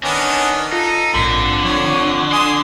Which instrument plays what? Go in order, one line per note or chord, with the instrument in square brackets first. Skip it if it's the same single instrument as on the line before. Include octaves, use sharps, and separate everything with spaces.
[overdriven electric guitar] D#3 [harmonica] B3 C#4 D4
[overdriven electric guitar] D#4 [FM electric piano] F4 [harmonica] A4
[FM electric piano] A#1 G#2 B6 [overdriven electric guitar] F2 [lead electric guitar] D3
[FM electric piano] F3 [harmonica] C#5
[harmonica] G#5 D#6 [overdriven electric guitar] C6 [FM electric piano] D6